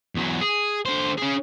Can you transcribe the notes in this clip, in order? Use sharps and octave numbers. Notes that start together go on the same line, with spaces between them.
E2 F#3
G#4
D3 C5
C#4 G#4